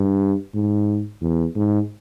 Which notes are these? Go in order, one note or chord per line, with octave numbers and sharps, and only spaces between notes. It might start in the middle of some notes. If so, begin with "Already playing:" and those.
Already playing: G2
G#2
E2
G#2